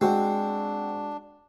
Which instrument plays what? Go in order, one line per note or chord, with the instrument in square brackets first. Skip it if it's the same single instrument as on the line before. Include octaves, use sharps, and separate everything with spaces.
[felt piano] G#3 F#4 [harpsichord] C4 [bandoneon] D4